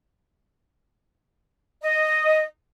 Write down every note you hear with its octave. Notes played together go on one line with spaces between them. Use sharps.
D#5